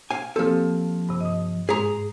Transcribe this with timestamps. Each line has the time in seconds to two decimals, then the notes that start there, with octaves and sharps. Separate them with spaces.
0.11 F5 G#5
0.36 F3 A#3 C4 G4 A4
1.09 G2 C3
1.21 D#5 D#6
1.69 G#2 G#3 G#4 A#5